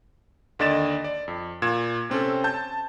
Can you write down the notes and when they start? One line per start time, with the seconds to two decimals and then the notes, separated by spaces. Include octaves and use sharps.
0.59 D#2 D3 D5 D#5 A6 E7
1.04 D5
1.28 F2
1.62 A#2 G#6 E7
2.10 C3 C4 C#4 A4
2.44 A5 G6